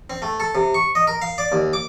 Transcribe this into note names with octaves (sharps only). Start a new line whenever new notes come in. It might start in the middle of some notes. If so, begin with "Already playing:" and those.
C4
A3
A4
C3
C#6
D#5
A#4
F5
D5
D#2
D6